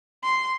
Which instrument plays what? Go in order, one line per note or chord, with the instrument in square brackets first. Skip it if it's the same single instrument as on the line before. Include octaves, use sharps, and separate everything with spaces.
[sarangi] C6